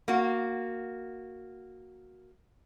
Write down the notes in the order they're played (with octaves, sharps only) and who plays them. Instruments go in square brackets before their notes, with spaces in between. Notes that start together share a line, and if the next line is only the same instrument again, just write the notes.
[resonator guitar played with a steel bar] A#3 F#4